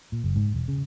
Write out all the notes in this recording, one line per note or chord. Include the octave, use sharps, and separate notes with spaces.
A#2
F#1
G#2
E1
C#3